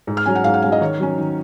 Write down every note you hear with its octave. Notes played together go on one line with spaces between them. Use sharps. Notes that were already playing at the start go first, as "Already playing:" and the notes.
G#2
F6
F#3 C#4 G#5
F#5
G#2 F5
F#5
F#3 C#4 F5
D#5
D#3 C#5
F#3 C#4
D#3